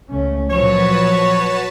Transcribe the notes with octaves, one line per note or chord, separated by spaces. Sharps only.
C#2 A3 C#4
A#2 F3 F#3 F#4 B4 C#5 A5